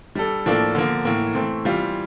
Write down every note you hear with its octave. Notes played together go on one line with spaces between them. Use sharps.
G3 D4 A4
A2 F3 A#3 D4 A4
D3 F3 A#3
A2 E3 A#3
E3 A3 C4
E3 G3 C4 F4